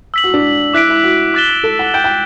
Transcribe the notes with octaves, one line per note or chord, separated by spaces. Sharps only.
E6 B6 F#7
F#4
D4
E4 D6 F#6 B6 D7
E4
F#4
D6 F#6 A6 E7 G7
A4
F#5
G5 G6 D7 G7
G5